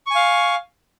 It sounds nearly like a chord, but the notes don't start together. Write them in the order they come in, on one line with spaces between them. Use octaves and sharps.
C#6 G#5 F5